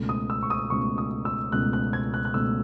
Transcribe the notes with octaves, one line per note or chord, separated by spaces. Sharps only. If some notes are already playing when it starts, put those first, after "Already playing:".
Already playing: C#2 B2 A3
D#6
E6
C#6
D#6
C#2 B2 A3 C#6
D#6
E6
C#2 B2 A3 F#6
F#6
G#6
F#6
F#6
C#2 B2 A3 E6